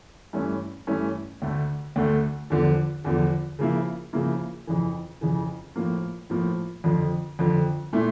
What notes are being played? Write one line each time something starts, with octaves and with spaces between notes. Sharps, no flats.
G2 E3 A3 C#4 E4
G2 E3 A3 C#4 E4
D2 D3 A3
D2 D3 A3
E2 D3 F3
E2 D3 F3
C#3 F3 A#3 E4
C#3 F3 A#3 E4
F2 C#3 E3
F2 C#3 E3
A2 F3 A#3
A2 F3 A#3
F2 D3 F3
F2 D3 F3
A#2 A3 E4